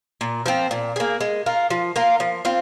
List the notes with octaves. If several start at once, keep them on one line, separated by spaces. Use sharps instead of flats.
A#2
F3 C4
A#2
A#3 G#4
G#3
F4 A#4
F3
A#3 F4 A#4
F3
C4 F4